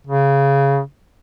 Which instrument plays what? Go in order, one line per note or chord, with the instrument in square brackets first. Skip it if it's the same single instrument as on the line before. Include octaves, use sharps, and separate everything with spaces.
[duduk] C#3